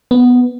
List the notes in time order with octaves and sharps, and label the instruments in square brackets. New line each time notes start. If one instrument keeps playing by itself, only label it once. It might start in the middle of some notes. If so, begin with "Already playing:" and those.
[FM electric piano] B3